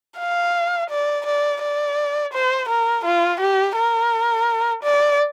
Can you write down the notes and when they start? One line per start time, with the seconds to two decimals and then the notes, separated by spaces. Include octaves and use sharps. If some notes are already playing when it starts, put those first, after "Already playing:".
0.20 F5
0.91 D5
1.26 D5
1.62 D5
2.34 C5
2.69 A#4
3.05 F4
3.41 G4
3.76 A#4
4.83 D5